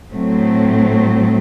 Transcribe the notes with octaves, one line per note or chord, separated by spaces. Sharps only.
A2 F#3 A3 C4